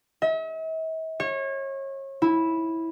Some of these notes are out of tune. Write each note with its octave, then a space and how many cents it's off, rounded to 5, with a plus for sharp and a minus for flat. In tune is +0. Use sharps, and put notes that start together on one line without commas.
E5 -45
C#5 -30
E4 -10